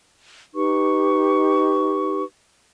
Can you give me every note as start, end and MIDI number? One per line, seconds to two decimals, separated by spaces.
0.54 2.22 63
0.54 2.22 67
0.54 2.22 71
0.54 2.22 85